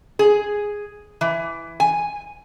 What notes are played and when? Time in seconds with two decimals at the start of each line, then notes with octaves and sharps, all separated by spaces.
0.19 G#4
1.21 E3
1.80 G#5